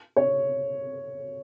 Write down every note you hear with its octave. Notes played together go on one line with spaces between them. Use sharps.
C#5